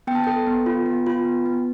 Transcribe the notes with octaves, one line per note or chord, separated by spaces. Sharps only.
B3 G5
A5
A4 G5
B3
F4
B3
F4
B3
B3